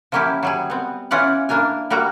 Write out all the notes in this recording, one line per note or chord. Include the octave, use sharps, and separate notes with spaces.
F3 F#3 A#3 C#4 E4 G4
F#3 G3 G#4
B3 C4
E3 C#4 F4 D5 F#5
E3 A#3 D4 A#4 G#5
G3 A#3 F#4 A#5